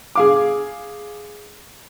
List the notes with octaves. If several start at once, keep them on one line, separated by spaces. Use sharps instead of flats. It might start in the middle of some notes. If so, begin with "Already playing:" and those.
G#4 F5 D6